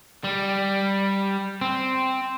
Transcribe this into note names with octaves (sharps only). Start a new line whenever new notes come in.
G3
C4